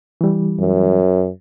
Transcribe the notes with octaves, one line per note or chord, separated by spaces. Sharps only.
E3 G3
F#2